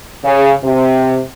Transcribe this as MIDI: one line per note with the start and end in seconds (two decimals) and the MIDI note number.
0.24 0.52 49
0.64 1.20 48